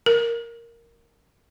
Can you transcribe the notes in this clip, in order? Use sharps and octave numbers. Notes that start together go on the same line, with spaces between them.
A#4